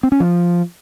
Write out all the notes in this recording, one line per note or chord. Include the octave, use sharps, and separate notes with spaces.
C4
C#4
F3